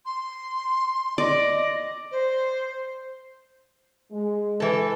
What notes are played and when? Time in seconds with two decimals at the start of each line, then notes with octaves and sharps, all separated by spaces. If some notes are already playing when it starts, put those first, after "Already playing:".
0.06 C6
1.18 D5 D#5
2.12 C5
4.11 G#3
4.60 E3 A4 B4